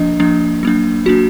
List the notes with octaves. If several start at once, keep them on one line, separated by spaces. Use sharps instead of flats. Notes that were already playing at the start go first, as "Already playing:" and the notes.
Already playing: F3 A#3 D4 D#5
F3 A#3 D4
F#3 A#3 D4
F#3 A#3 D4 F#4